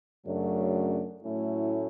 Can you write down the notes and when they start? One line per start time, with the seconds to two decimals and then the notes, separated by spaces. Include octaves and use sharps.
0.24 F#2 C#3 F#3 A3 D4
1.22 A2 F#3 A3 C#4 E4